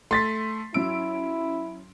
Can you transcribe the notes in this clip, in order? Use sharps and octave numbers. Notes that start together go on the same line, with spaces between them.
A3 C6 A6 B6
F#3 C#4 E4 E6 D7